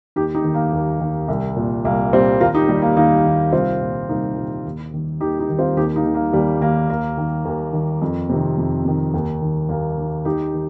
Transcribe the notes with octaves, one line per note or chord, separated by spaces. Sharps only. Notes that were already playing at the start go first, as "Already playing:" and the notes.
D#2 D#4 G4
D#4 G4
D#3
A#3
D#2
D#3
C2
A#2
C2 A#3
A#2 G3 C4
D#2 F4 A#4
D#4 G4
D#3 G3
A#3
D#2 A#3 D#4
D#3
C2 C4 F4
A#2
C2 A#3 D#4
A#2
D#2
D#3
D#2 D#4 G4
D#4 G4
D#3
C4 F4
D#2 D#4 G4
A#3 D#4
D#3
A#3
D#2 G3
D#3 A#3
D#2 A#3
D#3
D#2
D#3
F2
C3 D#3
F2
C3 D#3
D#2
D#3
D#2 A#3
D#3
D#2 D#4 G4
D#3